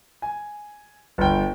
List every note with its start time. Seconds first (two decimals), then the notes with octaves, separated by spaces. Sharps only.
0.22 G#5
1.18 G1 G5